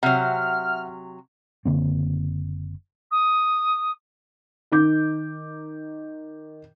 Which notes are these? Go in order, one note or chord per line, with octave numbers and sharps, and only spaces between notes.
C3 F#3 E5 F#5 F6
F#1 D3 A#3 C4
D#6
D#3 D#4 D6 G6